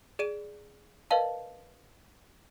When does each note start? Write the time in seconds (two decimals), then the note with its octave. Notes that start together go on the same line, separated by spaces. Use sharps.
0.19 G#4 D5 D7 D#7
1.11 A#4 B4 D5 D#5 F5 A5